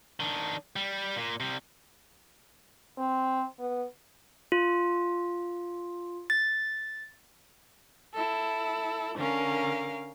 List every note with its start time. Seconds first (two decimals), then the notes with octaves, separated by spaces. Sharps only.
0.20 D#3 D4
0.76 G3
1.16 A#2
1.40 C3 G3
2.98 C4
3.59 B3
4.52 F4
6.30 A6
8.15 E4 A4
9.16 D3 C#4 A#4 F5